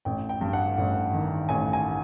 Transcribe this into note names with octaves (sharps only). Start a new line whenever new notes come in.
A1 G5
G5
G2
F#5
A1
D#3
A1 G#5
G#5